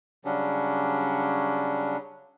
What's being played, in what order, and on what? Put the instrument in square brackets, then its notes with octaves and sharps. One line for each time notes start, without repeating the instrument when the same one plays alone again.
[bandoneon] C#3 F#3 G3 C#4 D4